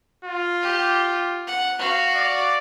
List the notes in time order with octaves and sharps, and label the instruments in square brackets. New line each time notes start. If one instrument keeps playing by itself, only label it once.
[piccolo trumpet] F4
[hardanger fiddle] G4
F#5
F#4 F5
[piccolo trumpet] D5